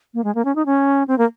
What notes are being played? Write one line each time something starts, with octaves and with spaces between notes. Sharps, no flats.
A#3
G#3
A#3
C#4
D#4
C#4
C4
A#3